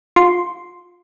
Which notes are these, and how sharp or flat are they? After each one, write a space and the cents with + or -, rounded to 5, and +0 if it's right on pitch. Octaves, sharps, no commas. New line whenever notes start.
F4 +20 C6 +0